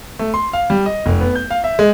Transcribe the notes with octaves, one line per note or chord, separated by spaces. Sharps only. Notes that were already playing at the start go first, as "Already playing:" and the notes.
A3
C6
F5
G3
D#5
F1
B3
G6
F5
E5
G#3